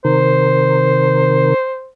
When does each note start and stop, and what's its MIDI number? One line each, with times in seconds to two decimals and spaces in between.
0.05 1.54 48
0.05 1.54 51
0.05 1.54 70
0.05 1.89 72